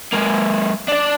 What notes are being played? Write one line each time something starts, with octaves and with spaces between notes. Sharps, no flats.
G#3 A#3
D4 D5